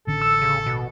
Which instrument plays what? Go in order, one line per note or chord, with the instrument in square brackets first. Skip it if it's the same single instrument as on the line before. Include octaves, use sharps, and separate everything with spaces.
[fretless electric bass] A1 D3 C#4 [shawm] A4
[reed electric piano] E6
[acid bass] C#3
B2